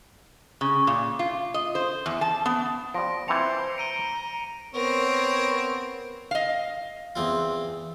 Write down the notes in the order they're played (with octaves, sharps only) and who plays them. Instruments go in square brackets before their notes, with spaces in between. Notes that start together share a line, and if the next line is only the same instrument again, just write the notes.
[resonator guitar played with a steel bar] C#3
A#2
F4
D#5
C5
E2
A5
B3
[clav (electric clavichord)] F3 G3 [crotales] A#6 D7
[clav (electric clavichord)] E3 C4 A5 [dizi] C5 [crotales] C#7 F7
[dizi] A#5 [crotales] D7 D#7 G7
[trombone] B3 [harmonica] C4 C#5 [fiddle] A#4
[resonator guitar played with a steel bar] D#5 F5
[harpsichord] E2 C4 F4